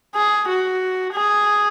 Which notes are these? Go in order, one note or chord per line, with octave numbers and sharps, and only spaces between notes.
G#4
F#4
G#4